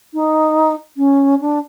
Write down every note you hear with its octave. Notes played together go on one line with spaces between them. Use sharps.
D#4
C#4
D4